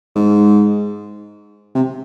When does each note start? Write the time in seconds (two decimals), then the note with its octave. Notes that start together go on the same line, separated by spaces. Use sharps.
0.16 G#2
1.75 C3